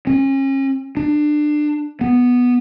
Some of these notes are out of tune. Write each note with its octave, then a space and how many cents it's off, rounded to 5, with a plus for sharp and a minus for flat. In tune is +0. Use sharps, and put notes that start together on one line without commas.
C#4 -35
D4 +25
B3 -5